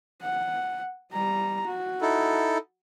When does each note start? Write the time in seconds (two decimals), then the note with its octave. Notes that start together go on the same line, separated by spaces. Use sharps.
0.22 F#5
1.12 G3 A#5
1.67 F#4
2.02 D#4 E4 A4